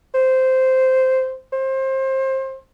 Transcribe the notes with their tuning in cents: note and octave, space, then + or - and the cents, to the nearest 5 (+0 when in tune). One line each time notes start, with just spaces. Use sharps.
C5 -10
C5 +25